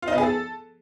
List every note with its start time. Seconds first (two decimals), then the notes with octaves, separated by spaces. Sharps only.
0.02 F4
0.08 D#4
0.13 B3
0.18 G#4
0.23 A4